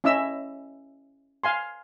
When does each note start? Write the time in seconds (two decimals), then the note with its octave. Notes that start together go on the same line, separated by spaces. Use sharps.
0.04 C#4 E4 D#5 E5 E6
1.44 F5 G#5 C6